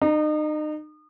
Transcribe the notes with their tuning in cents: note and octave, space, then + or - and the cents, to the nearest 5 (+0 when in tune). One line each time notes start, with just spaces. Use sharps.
D#4 -35 A#5 +0